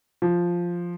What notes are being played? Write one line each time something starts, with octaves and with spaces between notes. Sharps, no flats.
F3